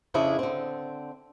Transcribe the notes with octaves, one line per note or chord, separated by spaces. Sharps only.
F2 C#3 D4 E4 G#4
D3 C4